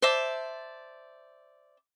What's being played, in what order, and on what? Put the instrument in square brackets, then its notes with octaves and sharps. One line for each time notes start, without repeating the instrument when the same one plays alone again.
[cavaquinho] C5 D5 E5 A5